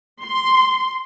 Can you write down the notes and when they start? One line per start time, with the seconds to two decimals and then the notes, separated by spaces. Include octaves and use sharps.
0.22 C6